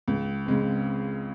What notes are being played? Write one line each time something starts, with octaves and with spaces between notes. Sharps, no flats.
C#2
C#3 G#3 C4